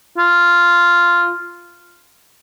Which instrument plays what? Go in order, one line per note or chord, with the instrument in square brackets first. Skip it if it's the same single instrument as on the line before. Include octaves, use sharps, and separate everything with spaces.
[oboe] F4